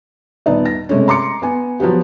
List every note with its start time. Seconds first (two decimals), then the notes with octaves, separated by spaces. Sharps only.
0.46 D#1 B3 D#4 D5
0.66 A#6
0.89 C3 G#3 A3 C#4
1.08 A#5 C6 D6 C#7
1.42 B3 G#5
1.80 F3 F#3 B3 G4